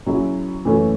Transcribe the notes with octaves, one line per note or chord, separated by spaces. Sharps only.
F#3 C#4 E4 G#4
F#2 E3 A3 C#4